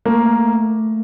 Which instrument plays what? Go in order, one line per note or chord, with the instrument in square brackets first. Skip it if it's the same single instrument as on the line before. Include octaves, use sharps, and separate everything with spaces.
[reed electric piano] A3 [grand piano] A#3